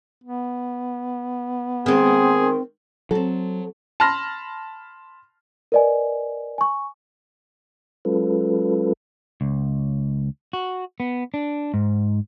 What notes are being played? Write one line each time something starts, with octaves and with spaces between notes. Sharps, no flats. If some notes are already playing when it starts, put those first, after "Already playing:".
B3
D#3 G#3 C4 G#4
F#3 C4 A4
A5 B5 C6 F6 A#6
A#4 B4 D5 D#5 G#5
G#5 C#6
F#3 G#3 C#4 F4 A4 B4
C#2
F#4
B3
D4
G#2